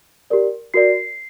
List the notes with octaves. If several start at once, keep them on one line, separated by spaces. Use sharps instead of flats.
G4 A#4 D5
F#4 A#4 D5 C7